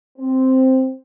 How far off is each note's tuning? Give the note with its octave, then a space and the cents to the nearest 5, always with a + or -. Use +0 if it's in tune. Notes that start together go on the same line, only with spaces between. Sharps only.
C4 +0